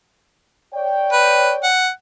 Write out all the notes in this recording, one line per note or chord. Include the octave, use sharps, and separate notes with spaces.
C#5 D5 G5
B4
F#5